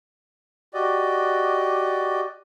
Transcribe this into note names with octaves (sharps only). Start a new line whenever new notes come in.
F#4 G4 D5 D#5